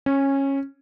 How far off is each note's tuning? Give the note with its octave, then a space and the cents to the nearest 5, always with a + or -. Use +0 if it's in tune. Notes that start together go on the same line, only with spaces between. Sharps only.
C#4 -15